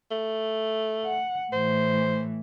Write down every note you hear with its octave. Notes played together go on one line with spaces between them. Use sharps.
A3
F#5
A2 E3 C5